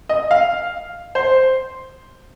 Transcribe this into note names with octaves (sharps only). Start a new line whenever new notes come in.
D#5
F5
C5